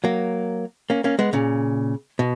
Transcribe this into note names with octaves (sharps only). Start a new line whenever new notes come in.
F#3 A#3
A#3 C#4
A#3 C#4
G#3 B3
A#2 C#3
B2